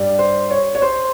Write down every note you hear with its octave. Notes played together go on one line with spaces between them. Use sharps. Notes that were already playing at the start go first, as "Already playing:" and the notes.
Already playing: G2 G3
C5
C#5
C#5
C5